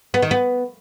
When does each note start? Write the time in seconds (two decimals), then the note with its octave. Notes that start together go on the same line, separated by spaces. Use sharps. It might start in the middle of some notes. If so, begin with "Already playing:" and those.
0.14 B3
0.22 D#3
0.31 B3